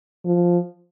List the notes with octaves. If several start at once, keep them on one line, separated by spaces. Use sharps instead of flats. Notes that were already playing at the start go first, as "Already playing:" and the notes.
F3